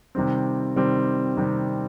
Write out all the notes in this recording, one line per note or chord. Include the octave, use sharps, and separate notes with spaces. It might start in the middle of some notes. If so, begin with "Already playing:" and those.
C3 D#3 G3 C4
C3 D#3 G3 C4
C3 D#3 G3 C4